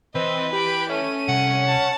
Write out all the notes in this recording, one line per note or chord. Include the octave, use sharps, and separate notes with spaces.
E3 C4 B4 D#5
G4 B5 D7
A3 C#4 D#7
C2 F#5
A5